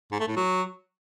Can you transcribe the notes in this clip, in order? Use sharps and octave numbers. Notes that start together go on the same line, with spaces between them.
G#2
A3
A2
F#3